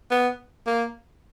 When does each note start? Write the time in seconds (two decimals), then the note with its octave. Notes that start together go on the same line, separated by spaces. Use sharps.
0.11 B3
0.67 A#3